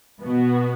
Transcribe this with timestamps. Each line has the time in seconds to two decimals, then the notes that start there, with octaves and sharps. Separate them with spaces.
0.21 B2 B3 F#4